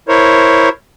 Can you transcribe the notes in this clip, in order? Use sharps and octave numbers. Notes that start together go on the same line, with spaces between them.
E4 A#4 C5 C#5